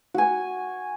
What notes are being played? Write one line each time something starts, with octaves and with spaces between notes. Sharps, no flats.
F#4 G#5